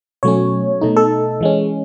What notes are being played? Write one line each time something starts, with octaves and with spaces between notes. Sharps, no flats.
B2 F#3 A3 C#4 C#5
B2 A3 D#4
A4
E3 G#3 C#4